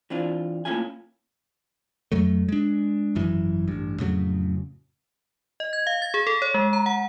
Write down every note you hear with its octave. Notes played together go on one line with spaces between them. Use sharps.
E3 C4 D4 F4
A3 A#3 C#4 E4 F4 G#5
F2 F#3 A3
G#3 D4
G#1 F#2 E3
A1 G2
F2 A2 C#3 F#3
D#5
G#6
F5
A6
G#4
A4
C#5
G#3
A#5
F#5